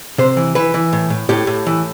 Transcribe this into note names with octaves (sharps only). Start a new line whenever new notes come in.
C3 C5
E3
E3 B4
E3
A2
A2
A2 G4
A2
E3